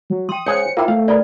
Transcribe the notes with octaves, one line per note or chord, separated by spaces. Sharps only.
F#3
G5 C6 D#6
C#2 G#4 C5 C#5 C#7
A#3 E4 F4 A#4 G5 A#5
A3 F5
D#4 A#4 B4 D5